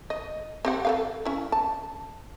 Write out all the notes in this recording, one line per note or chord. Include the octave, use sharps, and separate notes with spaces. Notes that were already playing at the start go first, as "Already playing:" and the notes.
D#5
C4 G4 F#5
A4 B4 F5
C#4 E4
A5